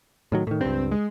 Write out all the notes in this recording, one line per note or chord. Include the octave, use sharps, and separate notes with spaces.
A2 D#3 F#3
A2 D#3
C#2 G2 C4
G#3